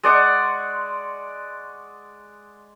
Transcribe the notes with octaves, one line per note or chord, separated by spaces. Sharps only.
G#3 D5 F#5 C#6